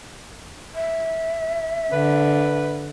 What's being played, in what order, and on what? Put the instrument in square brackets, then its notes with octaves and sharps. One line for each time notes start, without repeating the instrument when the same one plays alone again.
[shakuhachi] E5
[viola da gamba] D3 [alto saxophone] B4